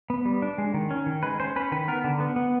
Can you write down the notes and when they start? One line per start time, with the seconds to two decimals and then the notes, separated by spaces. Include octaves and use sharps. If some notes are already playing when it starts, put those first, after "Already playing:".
0.10 B3
0.25 G3
0.42 D4
0.58 G#3
0.74 D#3
0.91 C#4
1.06 D#3
1.23 G#3 B4
1.40 C#4 C5
1.56 C#4 B4
1.72 D#3 B4
1.88 B3 A#4
2.04 D3
2.20 B3
2.36 B3